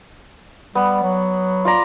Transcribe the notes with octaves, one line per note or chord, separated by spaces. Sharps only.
G3 B3
F#3
F4 D5 A#5